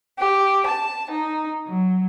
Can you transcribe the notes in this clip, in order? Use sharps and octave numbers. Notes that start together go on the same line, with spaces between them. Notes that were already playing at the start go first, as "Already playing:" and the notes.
G4
A5
D#4
F#3